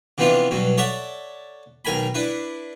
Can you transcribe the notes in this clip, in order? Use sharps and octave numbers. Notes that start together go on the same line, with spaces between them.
C3 E3 F3 B3 D4 F4
G2 B2 F#3
A4 C#5 D5 E5 F#5
B1 D#3 A#4 G#5 B5
D4 E4 B4